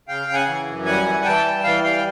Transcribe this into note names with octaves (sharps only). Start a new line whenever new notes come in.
C#3 F5 G5
C#3
F#5 G#5
E3
F#2
G3 F#5 G#5
E3
E3 G5 A5
G3
E3 F5 G5
G3 F5 G5